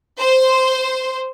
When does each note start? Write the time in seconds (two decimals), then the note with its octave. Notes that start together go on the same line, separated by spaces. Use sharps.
0.19 C5